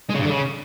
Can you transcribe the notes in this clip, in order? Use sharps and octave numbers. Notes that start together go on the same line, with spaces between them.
G#3
C#3
G2
D3
C#3